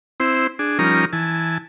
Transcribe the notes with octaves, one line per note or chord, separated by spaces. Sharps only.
C4 E4 C5
D4 G#4
F3 G3 C#4 D#4 A#4 A#5
E3 G#5 A5